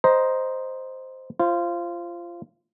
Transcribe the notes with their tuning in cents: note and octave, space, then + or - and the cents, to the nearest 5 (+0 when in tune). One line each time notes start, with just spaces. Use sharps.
C5 +0 D#5 +0 A#5 +20
F4 -20 C5 +20